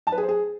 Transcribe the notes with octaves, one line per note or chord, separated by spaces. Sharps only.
A5
B4
G#4
C5
G#4